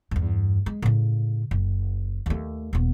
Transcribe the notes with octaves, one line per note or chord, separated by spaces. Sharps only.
E2 G2
G#3
A2 C#3
F#1
D#2 A3
D#1 B3